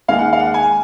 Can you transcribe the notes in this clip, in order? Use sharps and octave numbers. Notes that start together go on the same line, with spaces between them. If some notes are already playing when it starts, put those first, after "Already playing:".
D#2 D#3 G#3 F5
F#5
F5
F#5
G#5